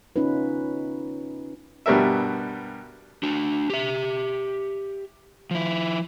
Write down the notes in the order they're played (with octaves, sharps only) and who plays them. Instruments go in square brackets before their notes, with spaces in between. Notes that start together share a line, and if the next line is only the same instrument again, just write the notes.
[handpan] C#4 D#4 F4 B4
[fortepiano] G2 B2 G3 A#4 E5
[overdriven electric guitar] D4 F#4
G4 E5
F3 E4